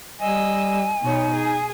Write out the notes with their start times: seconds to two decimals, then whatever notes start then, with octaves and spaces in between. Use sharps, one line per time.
0.20 G3 D#5 G#5 E6
1.02 B2 D#4 C#5
1.32 G#4